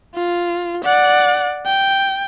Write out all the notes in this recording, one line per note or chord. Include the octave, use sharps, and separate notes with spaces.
F4
D5 F#5
G5